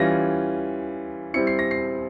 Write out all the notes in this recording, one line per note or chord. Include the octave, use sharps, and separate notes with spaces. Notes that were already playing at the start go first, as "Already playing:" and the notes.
Already playing: E3 G3 C#4 F4 A#6
G3 C4 E4 C#7
C7
A#6
C7